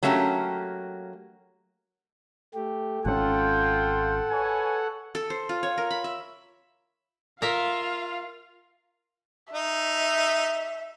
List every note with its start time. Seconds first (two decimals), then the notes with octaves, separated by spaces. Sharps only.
0.03 F#3 A3 A#3 C#4 G4
2.54 A3 G4
3.06 G#1 C3 C#4 F4 A4 F#5 G5
4.30 B4 C#5 G#5
5.15 A4
5.30 C5
5.49 F4
5.63 C#5
5.78 A#4
5.91 B5
6.04 E5
7.42 F4 A#4 E5 F5
9.53 D#4 E5